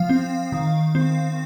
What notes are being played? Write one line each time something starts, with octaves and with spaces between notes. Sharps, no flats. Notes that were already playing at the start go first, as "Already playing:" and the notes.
Already playing: F3 F5
C4
D#3
C4